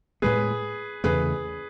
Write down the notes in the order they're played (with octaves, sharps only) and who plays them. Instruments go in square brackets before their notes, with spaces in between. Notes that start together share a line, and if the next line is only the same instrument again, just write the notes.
[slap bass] A2 G#3 B3 [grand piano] G#4 B4
[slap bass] E2 C#3 E3 A3 [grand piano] G#4 B4